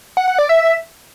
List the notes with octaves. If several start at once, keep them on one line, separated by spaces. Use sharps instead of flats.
F#5
F#5
D5
E5